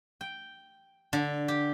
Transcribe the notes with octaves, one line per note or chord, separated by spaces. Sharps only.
G5
D3
G4